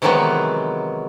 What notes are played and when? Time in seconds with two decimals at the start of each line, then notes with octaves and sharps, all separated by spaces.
0.02 C3 D#3 E3 F#3 G#3 B3